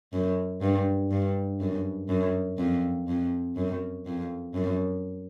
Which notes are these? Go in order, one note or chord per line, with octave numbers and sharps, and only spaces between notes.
F#2
G2
G2
F#2
F#2
F2
F2
F#2
F2
F#2